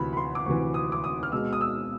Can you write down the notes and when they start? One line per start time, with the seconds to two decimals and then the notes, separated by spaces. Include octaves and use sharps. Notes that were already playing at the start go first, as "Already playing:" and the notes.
Already playing: D2 C3 E3 B5
0.13 B5
0.17 C6
0.35 D6
0.45 D2 C3 E3 C#6
0.74 D#6
0.92 D6
1.04 D#6
1.23 F6
1.32 B2 G#3 B3 E6
1.53 D#6
1.61 E6